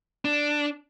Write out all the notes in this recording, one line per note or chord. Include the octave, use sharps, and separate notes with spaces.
D4